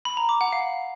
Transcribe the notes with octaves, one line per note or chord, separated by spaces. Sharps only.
B5
A#5
D6
F#5
F5